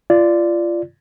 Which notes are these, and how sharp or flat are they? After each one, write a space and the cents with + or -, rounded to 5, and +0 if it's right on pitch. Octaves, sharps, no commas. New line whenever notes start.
F4 -25 D5 +0